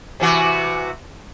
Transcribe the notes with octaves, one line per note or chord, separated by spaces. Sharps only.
C3 E3 F#4